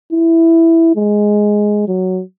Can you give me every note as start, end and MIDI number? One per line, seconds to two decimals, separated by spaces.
0.13 0.94 64
0.96 1.83 56
1.87 2.21 54